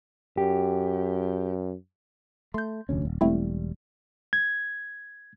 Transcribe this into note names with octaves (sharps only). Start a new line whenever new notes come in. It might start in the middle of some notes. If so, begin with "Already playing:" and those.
F#2 G4
A3 C6 G6
F1 D2 C#4
D#1
E1 G3 A3 C4 E4
G#6